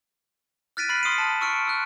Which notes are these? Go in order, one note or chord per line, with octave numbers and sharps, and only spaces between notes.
F6 F#6 A6 B6 D7 D#7
B5 F6 B6 C7 F#7
C6 D#6 C7 C#7 D#7
A5
C#6 E6 F6 C#7 D7
E6 F#6